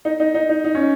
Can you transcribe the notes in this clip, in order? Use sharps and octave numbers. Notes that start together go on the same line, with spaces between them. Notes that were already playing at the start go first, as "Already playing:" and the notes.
D#4
D#4
D#4
D#4
D#4
C#4